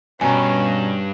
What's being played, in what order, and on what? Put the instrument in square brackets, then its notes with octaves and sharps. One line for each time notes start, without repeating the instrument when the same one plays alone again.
[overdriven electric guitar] G2 [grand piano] B2 A#5 [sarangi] C#4 [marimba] G#5